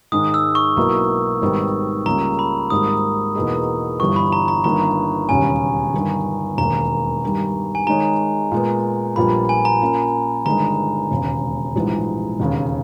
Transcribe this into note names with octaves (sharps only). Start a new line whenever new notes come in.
G#2 D#3 G#3 D#6
E6
C#6
B1 B2 A#3 E4
G#1 G#2 D#3 G3 B3
C#2 C#3 G3 A#3 A#5
B5
G#1 G#2 G3 A#3 D#6
E2 B2 A#3 D#4 G#4
G1 G2 E3 G3 C#6
B5
A#5
A#5
G1 G2 D#3 A#3 A#5
E1 D#2 C#3 G3 C#4 G#5
G1 G2 D#3
E1 D#2 D#3 A#3 A#5
G2 D#3 G3
G#5
D#3 G#3 D#4 G#4 C#5 A#5
A#2 G#3 B3
A#1 A#2 G3 B3 B5
G#5
A#5
A#2 A#3 C#4
G1 G2 D#3 G#3 A#5
E1 D#2 C#3
A#1 G#2 E3 G3
E1 D#2 C#3